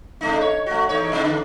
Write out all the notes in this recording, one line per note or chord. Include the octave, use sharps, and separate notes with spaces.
C3 A3 D#4
C#5
A3 F#4
E2 D#4 C#5
A2 C3 D#4
D3